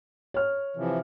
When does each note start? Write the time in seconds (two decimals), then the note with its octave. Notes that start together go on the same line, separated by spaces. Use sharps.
0.34 C#5 F6
0.76 C3 E3 F3